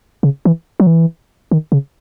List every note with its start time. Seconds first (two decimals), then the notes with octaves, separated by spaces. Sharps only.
0.23 C#3
0.45 E3
0.80 F#3
0.87 E3
1.51 D#3
1.72 C#3